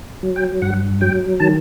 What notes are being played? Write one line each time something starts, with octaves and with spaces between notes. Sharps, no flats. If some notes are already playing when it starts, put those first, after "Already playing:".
F#3
G5
G2 F#5
F#3 G5
D#3 A5